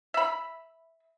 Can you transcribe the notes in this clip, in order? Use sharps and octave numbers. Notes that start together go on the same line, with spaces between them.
E5 B5